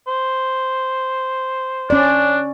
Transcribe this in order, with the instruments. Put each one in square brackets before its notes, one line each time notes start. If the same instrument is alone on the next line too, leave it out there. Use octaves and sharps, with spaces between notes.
[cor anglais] C5
[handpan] C#4 D5 [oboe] D4